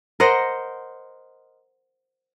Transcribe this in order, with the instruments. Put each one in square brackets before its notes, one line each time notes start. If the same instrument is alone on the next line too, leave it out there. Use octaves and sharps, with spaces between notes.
[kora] A#4 C5 D#5 F#5